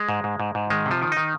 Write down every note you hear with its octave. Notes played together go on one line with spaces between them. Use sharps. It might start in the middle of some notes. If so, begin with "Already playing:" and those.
Already playing: G#3
G#2
G#2
G#2
G#2
D#3 G#3
C3 F3
D#3
D#3 D#4